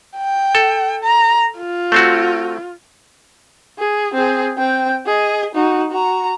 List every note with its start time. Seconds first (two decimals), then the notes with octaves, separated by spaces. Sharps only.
0.17 G5
0.55 A4
1.04 A#5
1.59 F4
1.92 A3 C4 F#4
3.79 G#4
4.14 C4 G#4
4.58 C4 G5
5.06 G#4 D#5
5.55 D#4 F#4
5.91 F#4 A#5